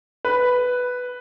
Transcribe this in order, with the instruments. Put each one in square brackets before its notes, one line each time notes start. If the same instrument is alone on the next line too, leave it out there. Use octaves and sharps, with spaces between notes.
[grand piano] B4